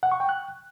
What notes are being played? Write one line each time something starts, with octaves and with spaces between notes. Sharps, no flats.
F#5
C#6
G5
F#6